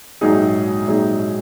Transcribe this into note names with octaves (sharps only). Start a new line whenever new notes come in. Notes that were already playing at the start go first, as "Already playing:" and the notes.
A#1 G#2 F#3 D#4 G#4
A#1 G#2 F#3 D#4 G#4